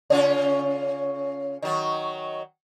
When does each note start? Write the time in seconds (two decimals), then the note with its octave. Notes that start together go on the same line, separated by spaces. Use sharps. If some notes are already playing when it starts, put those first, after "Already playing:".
0.10 C#3 C#4 F4
1.62 D#3 F#3